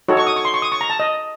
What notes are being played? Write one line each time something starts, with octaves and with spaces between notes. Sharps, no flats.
D#4 F#4 A4 C#5
C#6
D#6
C#6
C6
C#6
D#6
C#6
A#5
A5
D#5